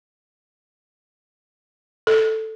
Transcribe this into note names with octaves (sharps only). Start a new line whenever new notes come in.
A4